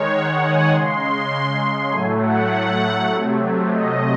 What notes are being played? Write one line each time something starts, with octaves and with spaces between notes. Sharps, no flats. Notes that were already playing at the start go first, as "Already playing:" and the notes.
Already playing: D#3 G#3 C#5
F#5
G#5
C#3 G#3 C6
A2 F#3 A3 G#5
F#5
C3 F#3 A3
D#5